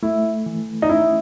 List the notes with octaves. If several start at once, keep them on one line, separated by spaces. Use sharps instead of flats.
A3 E4
E3
D#4
C#4 E4